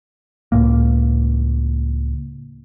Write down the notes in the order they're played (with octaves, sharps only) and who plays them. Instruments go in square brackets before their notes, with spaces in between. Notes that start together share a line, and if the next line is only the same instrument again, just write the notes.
[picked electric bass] C#2 A2 A#3